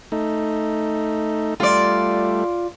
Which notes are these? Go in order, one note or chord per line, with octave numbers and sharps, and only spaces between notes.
A3 D#4
G3 A3 F4 D5